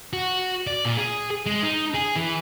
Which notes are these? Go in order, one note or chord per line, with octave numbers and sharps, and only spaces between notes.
F#4
D5
A#2
G#4
G#3
D#4
G#4
E3